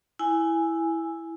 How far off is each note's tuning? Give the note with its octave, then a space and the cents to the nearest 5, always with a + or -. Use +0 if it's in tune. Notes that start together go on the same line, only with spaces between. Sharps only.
E4 +0 G#5 +0